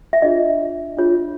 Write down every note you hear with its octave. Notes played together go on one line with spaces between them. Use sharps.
E5
D4 F4 G#4 C#5 D#5
D4 F4 G#4 C#5